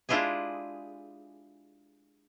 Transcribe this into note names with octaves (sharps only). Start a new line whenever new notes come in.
G#3 D4 E4 F4 G4 G#4